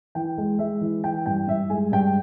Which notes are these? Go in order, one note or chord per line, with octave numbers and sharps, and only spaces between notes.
E3 G5
G#3
G#3 E5
E3
E3 G5
G2 G5
G2 E5
G#3 G#5
G2 G5